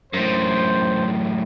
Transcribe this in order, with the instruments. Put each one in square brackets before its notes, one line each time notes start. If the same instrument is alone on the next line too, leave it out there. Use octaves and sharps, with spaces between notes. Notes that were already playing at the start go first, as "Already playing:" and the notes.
[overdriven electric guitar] F#2 A2 [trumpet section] C5